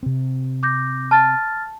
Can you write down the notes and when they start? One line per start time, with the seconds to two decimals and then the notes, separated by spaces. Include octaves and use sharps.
0.03 C3 C4
0.63 D6 G6 A#6
1.11 A5 F6 A6